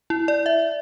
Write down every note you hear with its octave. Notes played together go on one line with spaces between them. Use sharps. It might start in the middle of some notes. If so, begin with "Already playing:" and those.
E4
D5
E5